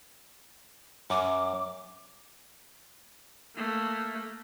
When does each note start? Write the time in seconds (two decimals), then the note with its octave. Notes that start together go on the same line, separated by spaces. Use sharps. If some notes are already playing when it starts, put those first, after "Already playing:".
1.10 F#2 D6
3.55 A3 A#3